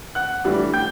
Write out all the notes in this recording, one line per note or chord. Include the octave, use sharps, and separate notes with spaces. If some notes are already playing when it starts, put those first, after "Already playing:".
F#5 F#6
A2 E3 G3 D4
G5 G6